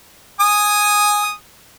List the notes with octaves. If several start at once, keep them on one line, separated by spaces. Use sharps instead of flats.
G#5 D#6